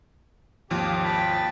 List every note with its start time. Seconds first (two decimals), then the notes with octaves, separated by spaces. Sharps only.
0.70 G#1 D#2 F3 G4
1.04 G5 A5 B5